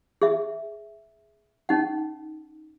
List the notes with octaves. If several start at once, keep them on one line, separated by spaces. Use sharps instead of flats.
G#4 E5
C#4 D#4 F#5